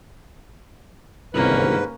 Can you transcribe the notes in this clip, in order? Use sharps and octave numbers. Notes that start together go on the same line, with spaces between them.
G1 C2 G#2 D#3 A#3 C#4 B4